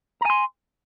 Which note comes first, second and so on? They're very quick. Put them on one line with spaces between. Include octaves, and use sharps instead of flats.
A#5 G#5 C6